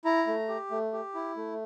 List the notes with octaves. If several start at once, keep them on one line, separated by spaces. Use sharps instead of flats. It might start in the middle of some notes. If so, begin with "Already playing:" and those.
E4 A#5
A3
G4
A3
G4
E4
A3